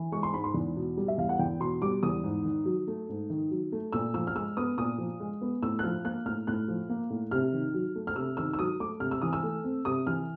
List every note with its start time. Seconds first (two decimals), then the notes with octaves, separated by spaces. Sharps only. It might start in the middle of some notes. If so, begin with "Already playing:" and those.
Already playing: E3
0.12 G#3 C#6
0.23 C6
0.33 G#2 B5
0.44 C6
0.54 E2
0.76 B2
0.97 G3
1.08 E5
1.18 E2 F5
1.29 F#5
1.39 E2 G5
1.60 B2 C6
1.82 G3 D6
2.03 E2 D#6
2.24 G#2
2.45 D#3
2.66 F#3
2.87 A3
3.09 G#2
3.30 D#3
3.51 F#3
3.72 A3
3.93 A#2 E6
4.14 F3 E6
4.27 F6
4.35 G#3 E6
4.57 B3 D#6
4.78 A#2 D#6
4.98 F3
5.20 G#3
5.41 B3
5.62 A2 E6
5.79 F#6
5.84 F3 F6
6.04 A#3 F#6
6.26 A2 F6
6.47 A2 F#6
6.68 F3
6.89 A#3
7.10 A2
7.31 C3 F6
7.53 D#3
7.74 F#3
7.95 A3
8.07 F6
8.16 C3 E6
8.37 D#3 E6
8.53 E6
8.59 F#3 D#6
8.80 A3 D6
9.00 C3 F6
9.11 E6
9.22 E3 D#6
9.33 E6
9.43 A3
9.64 C4
9.85 C3 D#6
10.07 E3 F6